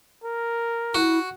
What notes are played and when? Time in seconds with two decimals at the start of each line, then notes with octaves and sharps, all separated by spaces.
0.24 A#4
0.95 E4 F#4